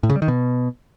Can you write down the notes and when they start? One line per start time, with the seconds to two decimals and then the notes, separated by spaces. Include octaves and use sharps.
0.03 A2
0.10 C#3
0.16 G3
0.22 D#3
0.28 B2